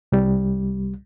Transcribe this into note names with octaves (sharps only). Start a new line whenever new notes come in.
C2 G3